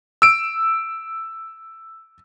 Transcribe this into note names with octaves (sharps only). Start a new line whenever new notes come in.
E6 D7